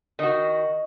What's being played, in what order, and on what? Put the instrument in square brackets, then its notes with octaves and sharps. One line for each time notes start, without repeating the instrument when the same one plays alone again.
[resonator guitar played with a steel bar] D#3 F#4 [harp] D#5